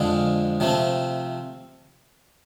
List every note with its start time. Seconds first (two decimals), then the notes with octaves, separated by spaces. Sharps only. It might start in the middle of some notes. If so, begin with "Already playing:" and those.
Already playing: F2 D3 F3 G#3 G#4
0.60 C3 F3 A3 C4